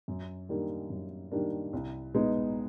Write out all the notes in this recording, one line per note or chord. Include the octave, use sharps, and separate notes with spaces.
F#2
D#3 G3 A#3 D4
F#2
D#3 G3 A#3 D4
C2
B2 G#3 B3 D#4